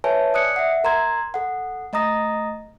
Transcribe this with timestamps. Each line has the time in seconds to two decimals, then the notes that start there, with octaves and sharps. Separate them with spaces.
0.04 B4 C#5 E5 G#5 A5
0.34 D5 D#6 F#6 C#7
0.56 E5 F#5
0.84 A#4 A#5 C6 G#6
1.34 A4 F#5
1.93 A3 D#5 A#5 D#6 A#6